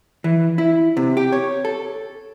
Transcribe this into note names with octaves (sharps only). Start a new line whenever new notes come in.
E3
E4
C3
G4
C#5
A4